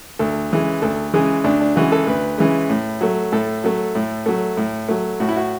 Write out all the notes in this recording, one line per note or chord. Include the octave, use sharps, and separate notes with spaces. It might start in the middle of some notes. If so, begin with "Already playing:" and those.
D2 A4
C#3 E3 G#3
D2 A4
C#3 E3 G#3 G#4
D2 D4
D4
C#3 E3 G#3 F#4
A4
D2 B4
C#3 E3 G#3
A2
F#3 A3
A2 A4
F#3 A3
A2
F#3 A3
A2
F#3 A3
A2 F#4
E4
F#4